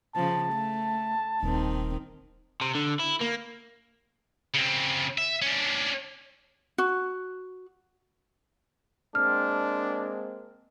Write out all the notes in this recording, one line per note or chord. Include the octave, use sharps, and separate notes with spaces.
C#3 F3 A5
A3
D#1 D#3 C4
C3
D3
E4
A#3
C#3 C4
E5
C#4 D4
F#4
G#3 A#3 C4 D4 F6